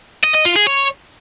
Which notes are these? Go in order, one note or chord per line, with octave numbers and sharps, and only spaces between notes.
D#5
D#5
F4
G#4
C#5